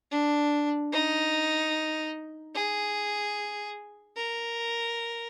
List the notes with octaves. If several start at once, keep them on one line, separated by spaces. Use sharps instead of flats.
D4
D#4
G#4
A#4